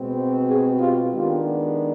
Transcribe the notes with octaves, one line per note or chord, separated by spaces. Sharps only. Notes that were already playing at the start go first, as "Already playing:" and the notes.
Already playing: B2 G#3 C4
F#4 G#4
F4 G4
D#3 G#3 B3 D4 F4 G4